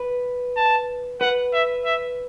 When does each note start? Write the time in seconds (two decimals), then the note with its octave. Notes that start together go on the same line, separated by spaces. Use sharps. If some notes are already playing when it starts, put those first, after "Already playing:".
Already playing: B4
0.57 A5
1.21 B4 F#5
1.53 E5
1.85 E5